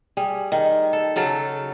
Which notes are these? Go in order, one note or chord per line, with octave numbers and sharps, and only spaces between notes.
G3 G#4
D#3
A4
C#3 F#3 A4 F5